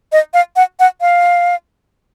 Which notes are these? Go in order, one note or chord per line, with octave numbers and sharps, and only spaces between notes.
D#5
F5
F#5
F#5
F5